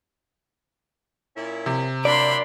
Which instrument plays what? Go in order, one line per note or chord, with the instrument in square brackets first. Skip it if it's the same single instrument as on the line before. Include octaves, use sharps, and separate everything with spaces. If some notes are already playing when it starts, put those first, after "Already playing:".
[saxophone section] A#2 C#4 E4
[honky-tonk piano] C3
[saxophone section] F#3 A#3 D4 [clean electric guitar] D5 [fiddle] B5 C6